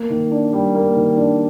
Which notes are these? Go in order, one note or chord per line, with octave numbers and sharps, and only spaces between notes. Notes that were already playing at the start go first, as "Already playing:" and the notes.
Already playing: A#3
D#3
D4
G3
A#3
D#3
D4